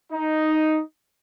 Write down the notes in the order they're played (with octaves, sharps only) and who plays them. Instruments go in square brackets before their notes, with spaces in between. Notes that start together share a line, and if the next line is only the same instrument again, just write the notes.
[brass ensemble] D#4